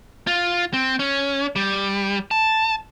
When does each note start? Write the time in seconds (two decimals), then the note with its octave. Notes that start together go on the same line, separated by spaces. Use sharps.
0.27 F4
0.74 C4
0.99 C#4
1.56 G3
2.31 A5